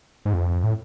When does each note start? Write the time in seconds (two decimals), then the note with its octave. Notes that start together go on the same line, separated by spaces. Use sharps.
0.25 G#2
0.33 F2
0.63 A2